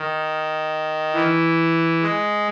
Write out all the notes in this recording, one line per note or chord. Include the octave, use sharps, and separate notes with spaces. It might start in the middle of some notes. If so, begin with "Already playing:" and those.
Already playing: D#3
E3
G#3